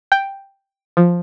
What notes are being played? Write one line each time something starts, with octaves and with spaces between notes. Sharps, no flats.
G5
F3